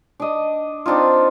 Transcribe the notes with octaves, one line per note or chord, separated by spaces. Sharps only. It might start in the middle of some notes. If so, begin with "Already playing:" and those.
D4 D#5
C4 D4 D#4 F4